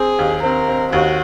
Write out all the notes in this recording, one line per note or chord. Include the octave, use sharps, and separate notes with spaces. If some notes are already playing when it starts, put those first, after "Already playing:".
Already playing: C4 G#4
D#2
C4 A#4
C4
D#2 F#4